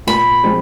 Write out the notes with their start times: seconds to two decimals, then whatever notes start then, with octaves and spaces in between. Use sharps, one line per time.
0.07 A#2 B5
0.43 F3 G#3 C4